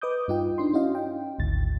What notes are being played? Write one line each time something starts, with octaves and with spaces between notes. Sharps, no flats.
B4 D#5 D6 D#6 G6
G2 D#4 F4 G5
D4 D#4 C6
C#4 E4 F#4 D#5 F5
G5
G#1 D2 G#2 A6